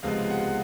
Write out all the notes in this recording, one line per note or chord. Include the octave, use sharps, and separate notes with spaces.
C#2 C3 F3 G#3 B3 F5
F#5